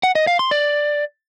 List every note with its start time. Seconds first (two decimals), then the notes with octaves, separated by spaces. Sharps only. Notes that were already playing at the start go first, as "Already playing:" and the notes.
0.03 F#5
0.15 D#5
0.27 F5
0.39 C6
0.51 D5